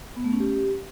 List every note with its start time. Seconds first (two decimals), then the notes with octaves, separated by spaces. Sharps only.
0.16 B3
0.24 A3
0.32 C#4
0.40 G4